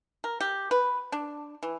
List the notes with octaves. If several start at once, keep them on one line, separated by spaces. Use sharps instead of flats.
A#4
G4
B4
D4
E3